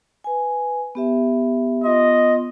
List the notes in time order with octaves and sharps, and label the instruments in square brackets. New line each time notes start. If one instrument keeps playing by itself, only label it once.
[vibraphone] B4 G#5
B3 G4 E5
[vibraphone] B3 F4 C6 [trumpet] D#5